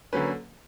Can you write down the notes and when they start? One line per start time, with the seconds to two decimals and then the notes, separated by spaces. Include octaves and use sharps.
0.13 D3 F#3 A#3 C#4 B4